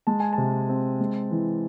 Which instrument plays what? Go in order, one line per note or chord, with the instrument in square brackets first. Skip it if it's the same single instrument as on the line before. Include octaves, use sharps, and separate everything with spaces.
[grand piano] G#3 A5
G#5
A5
C3
C4
G#3
E3